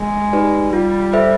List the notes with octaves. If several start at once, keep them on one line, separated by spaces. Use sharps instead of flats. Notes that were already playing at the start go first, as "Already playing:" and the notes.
Already playing: G#3 A#3
D#4 G4 B4 D5
G3 F4
A4 C5 E5